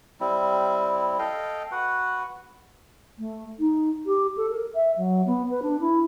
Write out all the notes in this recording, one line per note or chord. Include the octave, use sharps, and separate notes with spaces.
G3 C4 E4
A4 D#5 F5 G5
F#4 B4 F#5
A3
D#4
G4
A4
A#4
E5
F#3
B3
B4
D4
E4